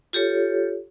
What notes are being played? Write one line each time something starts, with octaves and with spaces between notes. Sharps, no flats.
F4 G4 A4 C#5